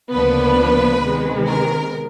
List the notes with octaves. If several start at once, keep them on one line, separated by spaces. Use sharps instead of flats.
D2 C#3 F3 A#3 B3 D4 B4
C3 D#3 G#3 B3
A#4